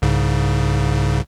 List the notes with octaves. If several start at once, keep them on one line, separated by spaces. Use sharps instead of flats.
C2 G#2 C#3